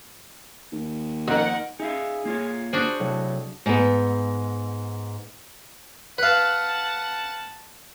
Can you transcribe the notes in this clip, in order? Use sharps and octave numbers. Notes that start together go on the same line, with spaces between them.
D#2
F2 D#4 A#4 F#5
D#4 G#4 E5 F5
A#3 F4 C#5
D4 F#4 G#4 C5
A2 C3 F#3
G#2 B3
B4 F5 F#5 A5